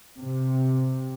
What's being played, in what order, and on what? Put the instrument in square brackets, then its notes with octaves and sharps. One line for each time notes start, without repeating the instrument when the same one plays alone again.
[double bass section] C3